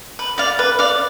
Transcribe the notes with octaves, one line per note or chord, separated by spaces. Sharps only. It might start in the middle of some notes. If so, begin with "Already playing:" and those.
B4
D5 F5
B4
D5 F5